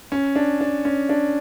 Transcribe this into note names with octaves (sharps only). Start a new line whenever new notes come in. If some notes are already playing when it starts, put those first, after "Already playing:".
C#4
D4
D4
C#4
D4